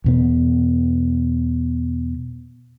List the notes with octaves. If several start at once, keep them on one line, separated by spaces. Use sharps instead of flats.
E2 B2 B3